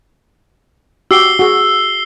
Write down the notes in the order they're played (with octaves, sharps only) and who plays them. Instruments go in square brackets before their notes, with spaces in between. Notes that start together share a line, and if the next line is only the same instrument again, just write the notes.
[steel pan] F#4 G4 D6 [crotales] E6 C7 G7
[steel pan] F#4 G#4